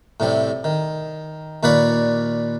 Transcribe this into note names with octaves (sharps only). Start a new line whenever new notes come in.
A2 C3 G3
D#3
D#2 A#2 B4 C#5 D5 B5